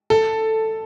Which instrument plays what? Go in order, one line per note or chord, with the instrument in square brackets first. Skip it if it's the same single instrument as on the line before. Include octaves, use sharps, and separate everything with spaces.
[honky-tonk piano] A4